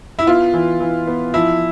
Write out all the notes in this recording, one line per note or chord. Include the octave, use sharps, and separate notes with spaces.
E4
B3 F4
E3
E3
B3
F3 E4